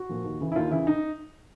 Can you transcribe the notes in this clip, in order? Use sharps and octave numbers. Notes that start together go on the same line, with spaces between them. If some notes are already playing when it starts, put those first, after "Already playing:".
Already playing: F#4
A#2 F3
D#2
C#3 E3
E4
D#2 F4
C#3 E3 E4
D#4